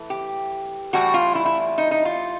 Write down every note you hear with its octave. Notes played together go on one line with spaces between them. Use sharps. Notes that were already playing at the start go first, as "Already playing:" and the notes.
Already playing: E3 A3
G4
A2 E3 G3 F#4
F4
E4
E4
D#4
D#4
F4